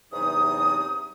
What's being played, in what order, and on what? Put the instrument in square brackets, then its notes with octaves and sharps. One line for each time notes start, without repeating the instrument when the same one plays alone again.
[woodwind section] E2 G2 C3 F#3 D#4 D#6